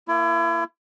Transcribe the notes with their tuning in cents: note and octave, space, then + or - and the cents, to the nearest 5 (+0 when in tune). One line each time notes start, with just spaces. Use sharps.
A#3 +0 E4 +35